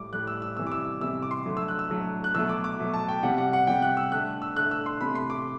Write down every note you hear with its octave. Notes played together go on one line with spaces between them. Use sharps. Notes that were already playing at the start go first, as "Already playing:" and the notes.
Already playing: A2 G3 D6
A2 G3 F#6
E6
E6
C3 E3 G3 E6
D6
E6
C3 E3 G3 E6
D6
C6
D3 F#3 A3
E6
F#6
E6
D3 F#3 A3
F#6
B2 F#3 A3 E6
D6
D6
B2 F#3 A3
A5
G5
C3 G3 F#5
F#5
F#5
C3 G3 G5
F#6
E6
D3 A3 F#6
E6
D3 A3 F#6
E6
C6
C3 E3 A3 B5
C6
D6